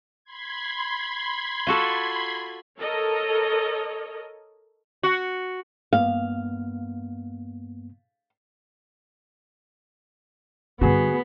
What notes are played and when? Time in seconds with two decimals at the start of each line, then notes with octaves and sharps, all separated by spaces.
0.24 B5 C6 G#6
1.67 F4 F#4 A4
2.78 A4 A#4 C#5 D#5
5.03 F#4
5.93 G2 A#3 B3 F5
10.81 G2 D3 B3 F#4 G#4